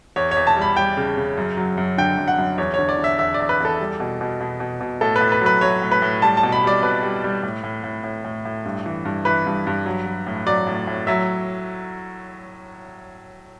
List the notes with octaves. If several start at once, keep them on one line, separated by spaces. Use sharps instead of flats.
E2 C#5
C#5
E2
A5
G3
B5
G3 G5
C#3
C#3
F#2
F#3
F#2
D3 G5
F#2
F#5
F#2
E2 C#5
D3 C#5
D5
D3
E5
E2 E5
D5
E2
B4
E2 A4
G3
B2
B2
B2
B2
B2
A2 A4
B4
A2
B4
F#3
B4
F#3 C#5
A2
B4
A2
G3 A5
A5
B2
B5
G3 D5
B2 B4
G3
G3
A2
A2
A2
A2
A2
A2
G2
E3
G2
E3 B4
G2
G2
F#3
F#3
A2
F#3 D5
A2
A2
F#3 E5